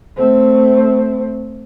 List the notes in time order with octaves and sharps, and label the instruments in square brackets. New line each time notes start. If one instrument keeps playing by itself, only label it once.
[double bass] A3 C4